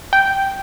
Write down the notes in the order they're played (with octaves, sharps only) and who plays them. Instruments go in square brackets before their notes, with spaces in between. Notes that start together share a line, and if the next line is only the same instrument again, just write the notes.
[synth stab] G5